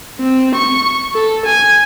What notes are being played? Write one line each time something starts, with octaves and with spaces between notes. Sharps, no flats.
C4
C#6
A4
G#5